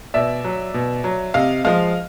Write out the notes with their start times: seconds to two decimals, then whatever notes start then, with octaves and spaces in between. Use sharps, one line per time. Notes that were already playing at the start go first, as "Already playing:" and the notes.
0.14 B2 D5 E5
0.44 F#3
0.74 B2
1.04 F#3
1.34 C3 D#5 F5
1.64 F3 G#3 D#5 F5